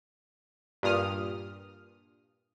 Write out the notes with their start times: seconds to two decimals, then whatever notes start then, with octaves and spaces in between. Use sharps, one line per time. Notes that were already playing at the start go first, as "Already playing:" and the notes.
0.83 G2 A#2 D#6 F6